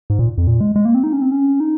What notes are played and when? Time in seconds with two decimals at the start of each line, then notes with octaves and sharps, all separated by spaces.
0.10 G#2
0.19 A#2
0.38 F2
0.47 A#2
0.61 G#3
0.76 G#3
0.85 A#3
0.95 C4
1.04 D#4
1.13 C#4
1.22 C4
1.32 C#4
1.60 D#4